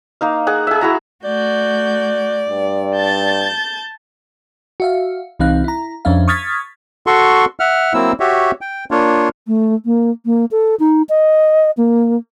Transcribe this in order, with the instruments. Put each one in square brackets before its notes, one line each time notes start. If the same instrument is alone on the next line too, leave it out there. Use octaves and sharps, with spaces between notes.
[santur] A#3 D#4 F5
G#4 F#5 A#5
G#4 E5
E4 F#4 A#5
[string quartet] A3 F#4 G6 [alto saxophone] D5
[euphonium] G2
[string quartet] A5 G6 A6
[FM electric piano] F#4 E5 F5
C2 E3 C4 D#4 F5 F#6
E4 A#5
F2 C#4 D4 E5 F5
C#6 D#6 F6 G#6 A6 B6
[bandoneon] F#4 A4 C6 C#6
E5 F#5 F6
F#3 A#3 C4 E4 E6
F#4 G4 C#5 E5
G5
A#3 D4 F4 C#5
[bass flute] A3
A#3
A#3
A4
D#4
D#5
A#3